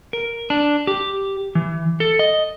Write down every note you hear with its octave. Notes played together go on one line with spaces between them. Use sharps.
A#4
D4
G4
E3
A4
D#5